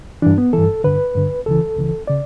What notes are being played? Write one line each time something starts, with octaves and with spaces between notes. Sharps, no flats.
G2 E3 D4
B3
G2 E3 A4
G2 D3 B4
G2 D3
C#2 C#3 E3 A4
C#2 C#3 E3
C#3 D5